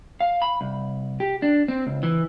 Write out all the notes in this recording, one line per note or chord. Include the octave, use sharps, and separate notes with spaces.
F5
B5
C2
G4
D4
C4
C#2
E3